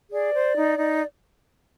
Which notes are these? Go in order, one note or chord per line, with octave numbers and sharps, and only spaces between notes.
G#4 D5
C5
D#4
D#4